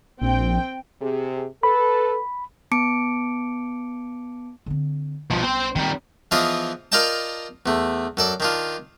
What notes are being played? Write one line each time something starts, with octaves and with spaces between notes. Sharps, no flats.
A#1 C4 G5
C3 G#4
A4 B4 B5
B3 A5 D6 C#7 D7
D3 C4
B1 B2 F3 G3
C4 C5
D#3 G3 C4
E3 F3 B3 F4 G#4 D#5
F4 A#4 D5 D#5 G5 A5
E2 A3
F#2 A4 D5
D#3 D4 F4